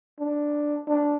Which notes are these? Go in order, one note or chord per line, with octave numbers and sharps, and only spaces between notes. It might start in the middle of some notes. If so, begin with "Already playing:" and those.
D4
D4